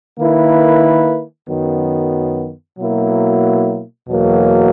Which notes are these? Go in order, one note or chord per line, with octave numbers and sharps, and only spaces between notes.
D#3 A#3 E4 B4
F#2 D#3 F#3 B3
B2 F#3 A#3 E4
E2 B2 F#3 A#3